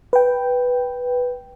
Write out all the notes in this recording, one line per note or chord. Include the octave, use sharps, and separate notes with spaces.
B4 G5